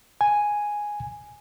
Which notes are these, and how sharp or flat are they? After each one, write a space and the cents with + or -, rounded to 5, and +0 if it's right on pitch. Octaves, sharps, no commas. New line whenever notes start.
G#5 +0